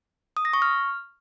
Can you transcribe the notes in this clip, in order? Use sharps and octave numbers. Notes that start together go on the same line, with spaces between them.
D#6
A#6
C#6
F6